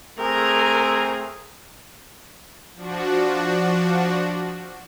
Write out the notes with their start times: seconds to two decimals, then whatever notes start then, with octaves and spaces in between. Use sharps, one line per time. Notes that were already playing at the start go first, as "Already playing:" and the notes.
0.19 A3 C4 G#4 A#4
2.75 F3 D4 F#4